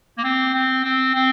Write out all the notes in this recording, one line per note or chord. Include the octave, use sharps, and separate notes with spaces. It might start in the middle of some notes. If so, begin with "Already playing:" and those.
A#3
C4
C4
C4
C4